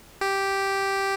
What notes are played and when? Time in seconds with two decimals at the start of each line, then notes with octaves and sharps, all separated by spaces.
0.21 G4